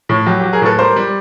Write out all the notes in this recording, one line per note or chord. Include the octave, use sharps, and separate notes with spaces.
A2
F#3 G4
G4
F#3
G#4 A#4
A2 A4 B4
G3 A#4 C5
G3